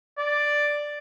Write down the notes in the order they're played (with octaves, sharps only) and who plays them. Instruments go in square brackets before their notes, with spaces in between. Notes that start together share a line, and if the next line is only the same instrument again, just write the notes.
[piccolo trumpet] D5